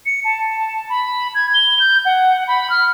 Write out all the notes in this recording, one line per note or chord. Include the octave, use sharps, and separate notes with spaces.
C#7
A5
B5
G#6
G7
G6
F#5
B5
F6